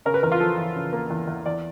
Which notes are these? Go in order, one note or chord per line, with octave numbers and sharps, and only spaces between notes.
C#3 A#4
B4
E2 A#4
F4
F3 A4
E2
C#3
A#3
E2
E2
E2 D5